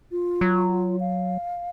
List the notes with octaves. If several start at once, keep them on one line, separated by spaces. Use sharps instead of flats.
F4
F#3
F5